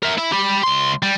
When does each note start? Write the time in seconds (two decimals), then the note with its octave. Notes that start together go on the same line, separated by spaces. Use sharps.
0.03 A#4 E5
0.18 E4
0.32 G4 B5
0.63 C#2 C6
1.03 G3